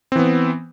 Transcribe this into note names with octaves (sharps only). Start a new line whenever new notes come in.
E3 B3 C4